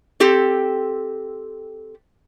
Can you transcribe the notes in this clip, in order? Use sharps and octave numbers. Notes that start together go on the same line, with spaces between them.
C4 G4 A4